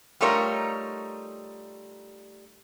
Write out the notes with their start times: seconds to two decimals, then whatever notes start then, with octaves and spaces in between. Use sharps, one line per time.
0.21 G3 A3 D#4 F4 A#4 C#5